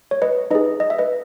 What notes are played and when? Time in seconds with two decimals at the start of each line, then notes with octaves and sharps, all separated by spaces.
0.11 C#5
0.22 B4 D#5
0.51 D#4 G#4 B4 D#5
0.80 D#5
0.90 E5
0.99 B4 D#5